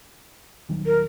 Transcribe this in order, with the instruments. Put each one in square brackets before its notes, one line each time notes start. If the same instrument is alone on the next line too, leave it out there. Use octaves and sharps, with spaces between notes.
[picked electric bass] D#1 D#3 F#3
[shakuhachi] A#4